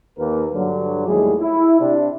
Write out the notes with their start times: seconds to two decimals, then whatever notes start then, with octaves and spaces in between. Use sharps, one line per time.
0.18 D#2 A#3 A#4 B4
0.54 G2 D3 F#3
1.07 D#2 A2 G3 G#3 G#4
1.40 E4
1.80 C3 D4